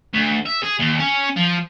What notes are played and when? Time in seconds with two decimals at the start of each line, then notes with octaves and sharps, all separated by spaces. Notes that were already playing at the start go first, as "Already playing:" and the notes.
0.13 D2
0.46 E5
0.63 G#4
0.79 D#2
0.99 C#4
1.36 F3